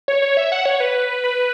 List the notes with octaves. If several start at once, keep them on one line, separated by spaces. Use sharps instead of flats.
C#5
C#5
E5
F#5
C#5
B4
B4